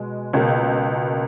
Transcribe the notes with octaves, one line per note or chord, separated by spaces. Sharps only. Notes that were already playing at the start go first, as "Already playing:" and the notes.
Already playing: B2 G#3
C#2 B2 A#3